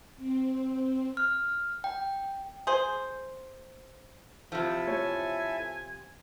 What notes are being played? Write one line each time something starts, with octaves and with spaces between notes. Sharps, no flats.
C4
F6
G5
G#4 C5
C3 F3 E4 A4 E5
C#5 G#5